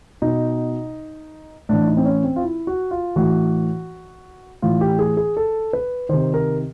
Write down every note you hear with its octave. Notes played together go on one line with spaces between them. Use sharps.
B2 D#4
A2 E3 D4
D#4
C4
C#4
C4
F4
E4
F#4
F4
A2 E3 F#4
A2 E3 F4
G4
G#4
G#4
A4
B4
C3 D#3 C5
A#4